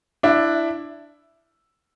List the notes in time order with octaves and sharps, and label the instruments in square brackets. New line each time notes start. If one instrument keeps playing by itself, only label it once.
[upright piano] D4 E4